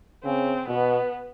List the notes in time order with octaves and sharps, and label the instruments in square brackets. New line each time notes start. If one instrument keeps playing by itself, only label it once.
[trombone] C#3 [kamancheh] C4
[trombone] B2 [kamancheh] B3